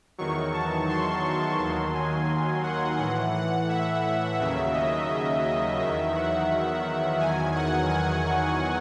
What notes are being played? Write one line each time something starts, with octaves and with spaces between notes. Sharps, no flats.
E2 D#3 F#3 C#6
A5
C6
C#6
D#2 D#3 F#3 C6
G#5
F#5
A2 E3 F#5
F#5
E5
D#2 C#3 F#3 E5
D#5
E5
D#5
E2 D#3 F#3 E5
F#5
E2 D#3 F#3 G#5
F#5
G#5
C#6